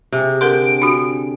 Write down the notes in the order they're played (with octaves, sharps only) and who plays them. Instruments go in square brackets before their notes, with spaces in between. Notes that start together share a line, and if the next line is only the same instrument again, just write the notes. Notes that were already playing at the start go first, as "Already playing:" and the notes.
[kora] C3 [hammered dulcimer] G#4
[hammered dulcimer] D3 [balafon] A4 A#4 C6 [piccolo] D7
[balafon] D4 F#4